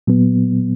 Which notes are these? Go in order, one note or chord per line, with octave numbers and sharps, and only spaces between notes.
A#2 F#3 B3